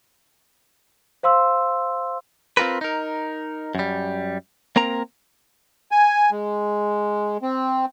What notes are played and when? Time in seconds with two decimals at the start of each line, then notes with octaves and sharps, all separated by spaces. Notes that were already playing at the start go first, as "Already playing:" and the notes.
1.23 C5 F5 C6 E6
2.57 C4 F4 F#4 A#4 B4
2.81 D#4 A#4
3.75 F#2 G3
4.76 A#3 C4 A#4 A#5
5.91 G#5
6.31 G#3
7.42 C4